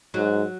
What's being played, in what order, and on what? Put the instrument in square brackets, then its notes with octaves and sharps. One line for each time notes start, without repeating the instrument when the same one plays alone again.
[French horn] G#2 [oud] F#3